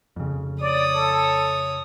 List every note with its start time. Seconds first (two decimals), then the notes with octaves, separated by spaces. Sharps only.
0.16 F2 C#3
0.61 C#5 D5 D#6
0.95 A4